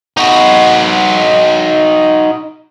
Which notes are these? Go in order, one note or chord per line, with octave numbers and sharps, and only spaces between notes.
D#4 F#4